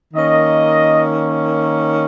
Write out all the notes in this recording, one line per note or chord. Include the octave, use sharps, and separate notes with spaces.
D#3 A#3 C#4 D#5